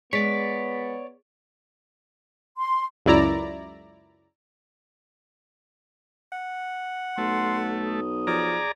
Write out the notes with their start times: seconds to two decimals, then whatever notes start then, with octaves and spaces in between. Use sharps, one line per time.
0.13 G#3 B3 C#5 D5 B6
2.57 C6
3.06 C#2 F#2 E4 D5 A#5
6.32 F#5
7.18 B1 A3 C6
7.86 D#6
8.27 F3 G#4 D5 A#5